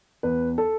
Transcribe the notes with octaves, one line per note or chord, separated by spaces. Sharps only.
E2 B4
A4